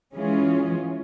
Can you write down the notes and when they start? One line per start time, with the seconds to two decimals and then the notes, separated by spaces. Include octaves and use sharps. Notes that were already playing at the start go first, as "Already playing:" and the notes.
0.15 E3 G#3 C#4 F4 G#4